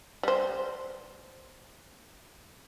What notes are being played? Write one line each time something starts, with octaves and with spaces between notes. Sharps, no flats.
G3 C5